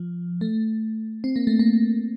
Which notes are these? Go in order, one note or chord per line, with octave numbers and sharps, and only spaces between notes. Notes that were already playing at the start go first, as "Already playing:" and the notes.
Already playing: F3
A3
C4
A#3
A3
A#3